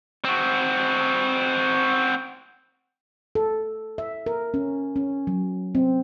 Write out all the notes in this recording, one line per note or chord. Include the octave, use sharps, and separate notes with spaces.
C4 F#4
A4
E5
A#4
C#4
C#4
F#3
C4